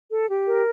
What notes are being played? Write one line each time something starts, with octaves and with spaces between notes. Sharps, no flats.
A4
G4
A#4